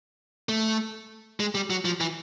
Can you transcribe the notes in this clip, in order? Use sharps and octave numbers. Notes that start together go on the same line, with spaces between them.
A3
G#3
G3
F#3
F3
E3